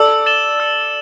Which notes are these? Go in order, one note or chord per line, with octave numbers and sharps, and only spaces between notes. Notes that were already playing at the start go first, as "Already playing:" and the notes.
Already playing: A4 D5 E6
A6 E7 G7
E6